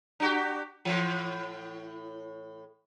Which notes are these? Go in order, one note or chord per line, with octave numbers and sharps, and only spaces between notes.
D4 F#4 G4
A2 E3